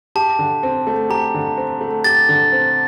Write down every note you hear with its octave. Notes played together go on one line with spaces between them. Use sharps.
G4 A5
D3
C4
A3
G4 A#5
D3
C4
A3
G4 A6
D3
C4